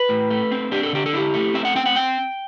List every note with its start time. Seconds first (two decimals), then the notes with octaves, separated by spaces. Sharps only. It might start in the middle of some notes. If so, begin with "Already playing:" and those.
Already playing: B4
0.09 A2
0.30 A3
0.51 C4
0.72 D4 G4
0.83 A4
0.93 D3 G4
1.06 A4
1.13 E4 G4
1.34 A3
1.54 C4 E5
1.65 F#5
1.76 C4 G5
1.86 F#5
1.96 G5